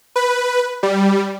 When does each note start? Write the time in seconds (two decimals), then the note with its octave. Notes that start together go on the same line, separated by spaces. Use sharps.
0.16 B4
0.83 G3